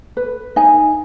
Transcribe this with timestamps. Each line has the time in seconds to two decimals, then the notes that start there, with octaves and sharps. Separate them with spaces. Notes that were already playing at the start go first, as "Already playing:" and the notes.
0.17 B4
0.56 D#4 G#5